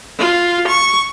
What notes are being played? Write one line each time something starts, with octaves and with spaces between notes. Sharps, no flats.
F4
C#6